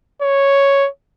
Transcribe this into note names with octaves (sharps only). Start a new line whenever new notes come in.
C#5